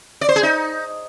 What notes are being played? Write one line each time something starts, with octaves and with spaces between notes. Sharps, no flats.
D5
C5
G#4
D#4